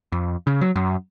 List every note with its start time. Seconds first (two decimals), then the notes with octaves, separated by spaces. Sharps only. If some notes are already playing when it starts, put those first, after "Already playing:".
0.12 F2
0.47 C#3
0.61 F#3
0.76 F#2